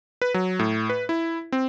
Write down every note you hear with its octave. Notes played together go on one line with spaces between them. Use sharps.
B4
F#3
A2
B4
E4
C4